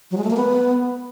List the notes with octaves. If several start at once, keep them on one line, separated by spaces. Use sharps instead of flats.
F#3
G#3
A3
A#3
B3